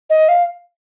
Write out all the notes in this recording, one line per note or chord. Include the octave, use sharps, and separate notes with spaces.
D#5
F5